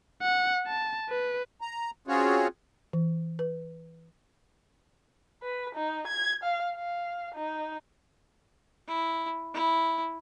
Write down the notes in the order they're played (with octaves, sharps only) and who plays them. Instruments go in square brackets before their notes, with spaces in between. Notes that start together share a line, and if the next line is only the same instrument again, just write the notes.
[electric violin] F#5
A5
B4
[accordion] A#5
C4 C#4 F4 F#4 G#4 C#5
[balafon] E3
B4
[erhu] B4
D#4
G#6
F5
F5
D#4
[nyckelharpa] E4
E4